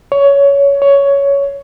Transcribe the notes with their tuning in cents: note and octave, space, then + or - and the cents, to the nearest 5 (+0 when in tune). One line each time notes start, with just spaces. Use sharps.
C#5 +15
C#5 +10